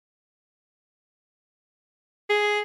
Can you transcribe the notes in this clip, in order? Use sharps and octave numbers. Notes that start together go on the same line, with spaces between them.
G#4